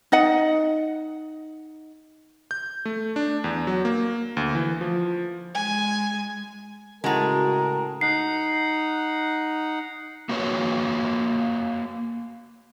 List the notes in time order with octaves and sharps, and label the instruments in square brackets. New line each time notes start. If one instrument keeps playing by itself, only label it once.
[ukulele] D#4 D#5 F#5
[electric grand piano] G6
A3
D4
E2
F#3
A#3
D2
E3
F3
[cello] G#3 [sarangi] G#5
[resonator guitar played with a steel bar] A2 G#3 [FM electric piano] C#3 F#4 A5 [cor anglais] A#4
[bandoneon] D#4 F#5 [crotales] C7
[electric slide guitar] A#3 F#4 B4 C#5